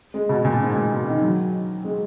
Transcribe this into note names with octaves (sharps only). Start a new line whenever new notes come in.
G#3
B2
A#2
G#2
A#2
B2
D#3
F#3
G#3